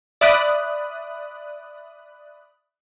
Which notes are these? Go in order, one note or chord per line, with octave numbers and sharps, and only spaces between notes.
D5 E5 B5 D#6 F#6